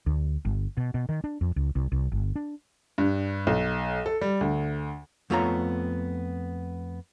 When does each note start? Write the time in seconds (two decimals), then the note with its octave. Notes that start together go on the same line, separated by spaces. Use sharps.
0.06 D2
0.45 G1
0.77 B2
0.94 B2
1.09 D#3
1.24 D4
1.41 F2
1.56 C#2
1.75 C2
1.92 C2
2.12 G1
2.36 D4
2.98 G2
3.47 B1
4.06 A4
4.21 G3
4.41 D2
5.30 F2 A3 B3 F4 C#5 A#5